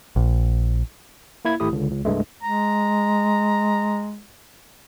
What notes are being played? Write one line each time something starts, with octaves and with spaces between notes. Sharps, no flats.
A#1
A#3 E4 G#6
G#1 A3 E4 G4 D#6
C#2 D3
C#2
C2 G2 G#3 A3
G#3 A#5